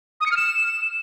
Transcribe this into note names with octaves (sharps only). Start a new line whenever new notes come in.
D#6
C#7
F6
E7